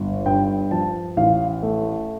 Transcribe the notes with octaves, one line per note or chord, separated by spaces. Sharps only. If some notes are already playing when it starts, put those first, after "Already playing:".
Already playing: G1
G2 G5
F3 A5
A1 F5
A3